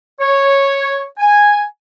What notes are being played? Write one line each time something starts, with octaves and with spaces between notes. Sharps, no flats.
C#5
G#5